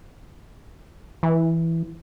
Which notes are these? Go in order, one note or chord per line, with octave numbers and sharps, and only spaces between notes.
E3